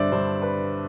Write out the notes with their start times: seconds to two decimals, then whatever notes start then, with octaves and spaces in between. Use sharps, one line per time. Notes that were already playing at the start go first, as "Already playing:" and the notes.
Already playing: G2 D3 G3 C5 D5 E5
0.12 G2 D3 G3 C5
0.42 B4